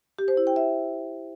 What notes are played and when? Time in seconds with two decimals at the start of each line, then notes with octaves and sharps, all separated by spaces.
0.19 G4
0.28 C5
0.37 E4
0.47 G5
0.56 E5